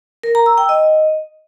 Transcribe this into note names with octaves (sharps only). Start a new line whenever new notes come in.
A#4
A#5
E6
G5
D#5